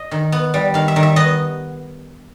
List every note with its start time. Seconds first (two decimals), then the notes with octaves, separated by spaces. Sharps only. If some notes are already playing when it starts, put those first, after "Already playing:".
Already playing: D#5
0.11 D#3
0.32 B3
0.54 G3
0.74 D#3 F5
0.88 E5
0.96 D#3
1.03 E5
1.16 B3 D#5